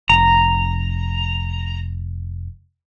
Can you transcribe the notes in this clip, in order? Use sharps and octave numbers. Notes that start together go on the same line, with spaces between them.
F1 A#5